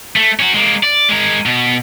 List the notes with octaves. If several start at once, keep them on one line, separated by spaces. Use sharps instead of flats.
A3
C#4 F#4
G#3 A#3
D5
G#3 A#4
B2